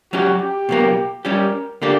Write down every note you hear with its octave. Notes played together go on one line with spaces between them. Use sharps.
F#3 C#4 F#4 G4
G4
B2 F#3 A#3
G3 C#4 G4 A#4
D3 A#3 D4 G4